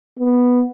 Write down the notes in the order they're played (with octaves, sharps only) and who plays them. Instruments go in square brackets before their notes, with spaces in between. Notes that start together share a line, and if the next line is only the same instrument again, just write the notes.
[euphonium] B3